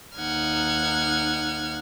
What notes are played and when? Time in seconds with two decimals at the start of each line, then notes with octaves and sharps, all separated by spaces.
0.16 D#2 D#4 F#5 F6 G#6